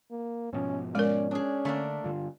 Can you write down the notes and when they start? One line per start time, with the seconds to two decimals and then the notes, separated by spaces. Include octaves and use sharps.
0.11 A#3
0.53 G#2 B2 F3 C#4
0.95 G#3 C#4 A#4 D5
1.31 C#4 D4 G#4
1.65 D3 A3 A#3 D4
2.04 G2 D3 F4